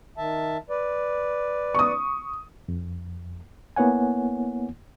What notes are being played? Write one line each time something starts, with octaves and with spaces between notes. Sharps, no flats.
D#3 E5 A5
B4 D5
C#6 D#6
F2
A#3 B3 E4 C#5 F#5 G#5